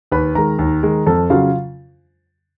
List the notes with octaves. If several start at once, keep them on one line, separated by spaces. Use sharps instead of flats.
D#2 B4 B5
D#3 G#3 A#4 A#5
D#2
D#3 G#3
F2 A4 A5
C#3 F#3 F4 F5